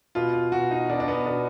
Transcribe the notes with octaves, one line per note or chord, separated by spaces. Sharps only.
B2 F4
F4
B2 F#4
D#4
B2 D4
D4
B3
B2 D4